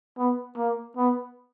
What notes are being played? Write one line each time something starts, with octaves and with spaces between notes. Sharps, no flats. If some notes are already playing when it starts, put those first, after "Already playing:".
B3
A#3
B3